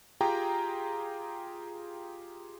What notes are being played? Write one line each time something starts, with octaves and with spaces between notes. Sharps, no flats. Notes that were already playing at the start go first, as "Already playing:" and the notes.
F4 G4 G#4 G5 A#5